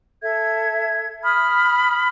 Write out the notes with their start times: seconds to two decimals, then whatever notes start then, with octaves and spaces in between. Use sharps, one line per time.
0.22 A4 E5 G#6
1.23 B5 D#6 F6